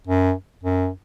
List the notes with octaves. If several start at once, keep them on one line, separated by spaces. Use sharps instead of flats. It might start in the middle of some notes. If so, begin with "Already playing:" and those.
F#2
F#2